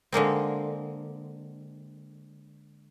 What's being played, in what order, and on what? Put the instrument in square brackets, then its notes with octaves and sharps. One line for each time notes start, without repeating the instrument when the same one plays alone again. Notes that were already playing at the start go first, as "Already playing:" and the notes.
[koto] D3 G#3 A#3 C4